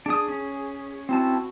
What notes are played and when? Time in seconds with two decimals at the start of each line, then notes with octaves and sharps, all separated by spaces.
0.06 D4 G#4 D#6
0.28 C#4
1.09 C4 E4 F#4 A5